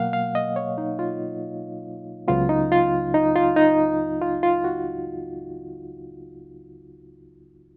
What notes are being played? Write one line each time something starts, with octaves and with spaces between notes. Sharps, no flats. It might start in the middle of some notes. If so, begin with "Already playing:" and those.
Already playing: B2 F#3 A#3 F5 F#5
F5
D#5
C#5
D#4
F4
C#2 C#3 F#3 B3 F4
D#4
F4
D#4
F4
D#4
F4
F4
F#4